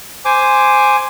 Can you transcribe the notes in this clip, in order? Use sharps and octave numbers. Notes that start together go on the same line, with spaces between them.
C5 G#5 D6